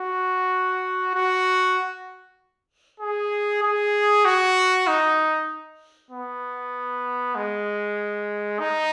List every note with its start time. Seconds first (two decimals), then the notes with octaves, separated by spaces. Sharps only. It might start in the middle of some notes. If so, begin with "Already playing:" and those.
Already playing: F#4
1.15 F#4
3.00 G#4
3.63 G#4
4.25 F#4
4.87 D#4
6.11 B3
7.36 G#3
8.60 D#4